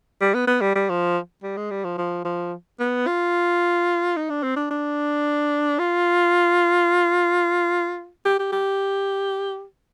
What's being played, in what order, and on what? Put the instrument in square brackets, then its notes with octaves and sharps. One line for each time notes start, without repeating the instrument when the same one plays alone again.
[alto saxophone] G3
B3
B3
G3
G3
F3
G3
G#3
G3
F3
F3
F3
B3
F4
D#4
D4
C4
D4
D4
F4
G4
G4
G4